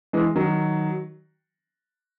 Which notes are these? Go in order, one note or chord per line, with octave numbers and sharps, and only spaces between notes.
E3 G#3
D#3 F#3